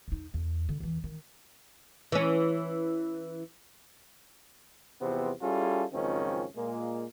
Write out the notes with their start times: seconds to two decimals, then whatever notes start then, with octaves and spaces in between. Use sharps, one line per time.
0.08 E2 D#4
0.34 E2
0.69 D3
0.80 E2 E3
1.04 D#3
2.12 E3 C#4
5.01 E2 C3 F3 B3 C4
5.41 G3 C#4 E4 F4 G#4 A4
5.93 C#2 F#2 D#3 F3 C4 C#4
6.56 A#2 G#3 A#3